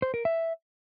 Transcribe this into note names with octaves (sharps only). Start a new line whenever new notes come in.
C5
A#4
E5